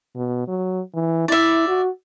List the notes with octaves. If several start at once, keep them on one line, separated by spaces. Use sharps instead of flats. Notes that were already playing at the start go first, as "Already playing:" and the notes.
B2
F#3
E3
E4 D5 E5
F#4